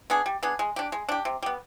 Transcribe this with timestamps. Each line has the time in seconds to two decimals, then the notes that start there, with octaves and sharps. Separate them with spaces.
0.10 B3 D4 G#4
0.26 G3
0.43 B3 D4 G#4
0.59 G#3
0.76 D4 G4
0.92 G#3
1.09 D4 G4
1.25 C3
1.43 G3 B3